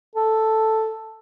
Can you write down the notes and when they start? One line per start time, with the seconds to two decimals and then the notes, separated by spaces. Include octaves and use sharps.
0.15 A4